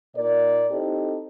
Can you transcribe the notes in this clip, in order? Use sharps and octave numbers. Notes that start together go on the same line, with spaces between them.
A#2 D#4 A#4 D5
C4 D#4 E4 G4 A4 C5